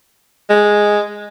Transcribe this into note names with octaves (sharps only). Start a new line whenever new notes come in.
G#3